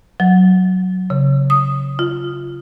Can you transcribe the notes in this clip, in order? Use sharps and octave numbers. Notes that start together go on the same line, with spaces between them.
F#3
C#3
D#6
F4